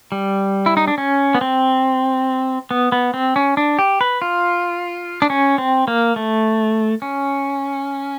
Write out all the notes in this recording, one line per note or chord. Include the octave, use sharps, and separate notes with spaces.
G3
E4
D#4
D4
C#4
B3
C4
B3
B3
C4
C#4
D4
G4
B4
F4
D4
C#4
C4
A#3
A3
C#4